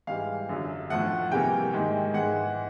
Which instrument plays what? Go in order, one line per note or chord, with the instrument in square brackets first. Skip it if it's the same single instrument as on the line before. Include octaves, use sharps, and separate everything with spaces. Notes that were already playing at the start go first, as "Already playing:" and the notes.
[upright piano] G#2 E3 G3 F5
F#2 D3 F#3
A2 F3 A3 F#5
C3 E3 G3 A#3 G5
G#2 D#3 G#3
G#2 E3 G#3 F#5